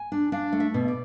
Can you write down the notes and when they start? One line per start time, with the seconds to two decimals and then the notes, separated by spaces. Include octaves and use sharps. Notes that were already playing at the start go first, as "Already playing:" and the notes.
Already playing: G#5
0.12 D4
0.32 D4 F5
0.52 A3
0.60 E5
0.74 B2
0.88 D5